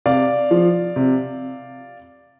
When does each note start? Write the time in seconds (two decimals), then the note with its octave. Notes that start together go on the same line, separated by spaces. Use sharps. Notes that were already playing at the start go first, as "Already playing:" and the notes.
0.06 C3 D5 F5
0.51 F3
0.96 C3